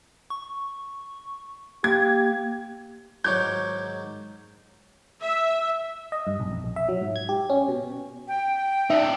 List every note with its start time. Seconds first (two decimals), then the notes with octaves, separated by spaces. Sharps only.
0.30 C#6
1.84 A#3 G4 G#6
3.24 G#2 D#3 F#3 C#5 D6 G6 G#6
5.22 E5
6.12 D#5
6.27 G2
6.40 B1
6.52 F2
6.64 A#1
6.76 E5
6.89 F#3
7.01 G#2
7.16 G#6
7.29 G4
7.50 C#4
7.69 B2
8.28 G5
8.90 D#4 D5 E5